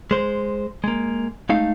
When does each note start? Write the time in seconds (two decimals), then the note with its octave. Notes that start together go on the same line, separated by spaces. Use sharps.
0.11 G#3 C5
0.84 G#3 A#3
1.49 G#3 A3 D#4 F5